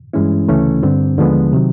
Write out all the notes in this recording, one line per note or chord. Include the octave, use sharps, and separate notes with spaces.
G2 E3 G#3 C#4 E4
D2 C#3 E3 A3 C#4
G2 D3 G3 C4
D#2 D3 F3 G#3 B3
C3 D#3 F#3